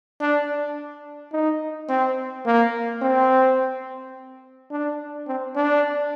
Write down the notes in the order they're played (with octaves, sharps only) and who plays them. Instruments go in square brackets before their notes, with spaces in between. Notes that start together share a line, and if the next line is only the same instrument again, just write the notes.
[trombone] D4
D#4
C4
A#3
C4
D4
C4
D4